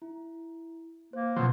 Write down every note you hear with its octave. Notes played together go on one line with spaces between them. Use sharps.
E4
A#3 C5
B2 D3 F3 F#3 C4